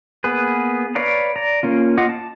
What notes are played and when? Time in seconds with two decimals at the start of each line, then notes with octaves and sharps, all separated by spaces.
0.24 A#3 B3 G#4 B4
0.95 B4 C#5 D5 F5 A#5
1.36 D5 A#5
1.63 A#3 C#4 F4
1.97 F4 D#5 F#5 D6
2.09 A5